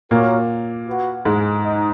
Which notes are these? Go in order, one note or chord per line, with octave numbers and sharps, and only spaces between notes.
A#2 A#3 F#4 A#4 C#5
F#4 B4 F#5
G#2 G#3
D#4